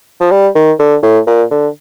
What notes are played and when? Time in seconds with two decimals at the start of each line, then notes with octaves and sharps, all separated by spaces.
0.20 F3
0.31 G3
0.55 D#3
0.79 D3
1.02 A2
1.27 A#2
1.51 D3